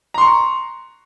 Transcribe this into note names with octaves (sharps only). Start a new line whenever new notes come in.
A#5 C6 C#6